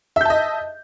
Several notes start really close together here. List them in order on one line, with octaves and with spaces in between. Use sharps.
E5 G6 A5 D#5